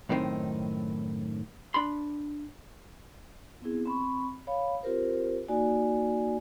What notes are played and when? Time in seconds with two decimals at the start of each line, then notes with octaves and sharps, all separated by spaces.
0.09 F#2 A2 D#3 G#3 C4 D#4
1.74 D4 B5 C6
3.62 B3 C4 E4 G#4
3.86 C4 B5 C#6
4.47 C#5 F5 B5
4.83 C4 F4 G4 A#4 C5
5.48 A#3 D#4 F#4 D5 G#5